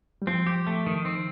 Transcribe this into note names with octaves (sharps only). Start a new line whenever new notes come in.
G3
F3 C4
G4
A3
D#3
C4